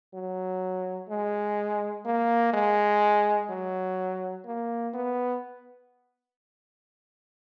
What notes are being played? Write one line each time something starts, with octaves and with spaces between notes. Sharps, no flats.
F#3
G#3
A#3
G#3
F#3
A#3
B3